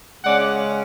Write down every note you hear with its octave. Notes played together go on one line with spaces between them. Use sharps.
C#3 G#3 C#4 D5 F#5